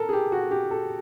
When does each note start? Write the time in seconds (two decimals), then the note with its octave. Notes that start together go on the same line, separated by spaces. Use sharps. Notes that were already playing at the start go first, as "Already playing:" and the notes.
Already playing: A4 A#4
0.09 G#4
0.13 G4
0.32 F#4
0.51 G4
0.71 A4